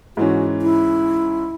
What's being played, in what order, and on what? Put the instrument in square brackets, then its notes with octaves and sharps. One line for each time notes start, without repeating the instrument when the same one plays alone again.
[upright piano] G#2 E3 C#4 [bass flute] F#4
[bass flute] E4